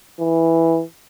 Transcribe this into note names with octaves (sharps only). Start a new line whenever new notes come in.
E3